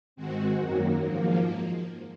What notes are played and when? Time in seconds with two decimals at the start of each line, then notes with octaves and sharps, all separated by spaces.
0.16 G#2 D#3 G#3 C4 F#4
0.60 F#2 D#3 F#3 A#3
1.04 G#2 F3 A#3